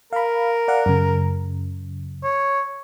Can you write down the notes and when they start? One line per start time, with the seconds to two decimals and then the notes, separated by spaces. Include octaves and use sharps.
0.13 A#4 F5 B5
0.68 D5 F5 F#5
0.86 F#2 C#3
2.23 C#5